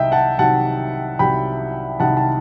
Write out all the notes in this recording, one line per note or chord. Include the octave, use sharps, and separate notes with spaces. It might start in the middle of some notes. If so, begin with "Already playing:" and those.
Already playing: C2 C3 D#3 F#3 D#5 E5 G5
F#5 A5
C2 C3 D#3 F#3 F#5 A5
C2 C3 D#3 F#3 G5 B5
C2 C3 D#3 F#3 F#5 A5
A5